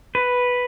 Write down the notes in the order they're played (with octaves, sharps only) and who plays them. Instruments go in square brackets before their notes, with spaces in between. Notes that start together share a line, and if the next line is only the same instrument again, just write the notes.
[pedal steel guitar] B4